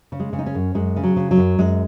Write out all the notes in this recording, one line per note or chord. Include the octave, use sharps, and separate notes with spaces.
C#3
G#3
C#3
D#4
C#4
F#2
F#2 G#3
C#3
F#3
C#3
F#3
F#2
F#2 G#3